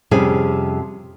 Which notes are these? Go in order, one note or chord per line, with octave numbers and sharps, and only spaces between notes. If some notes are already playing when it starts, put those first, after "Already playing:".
F2 C3 G3 C#4 G#4 G#5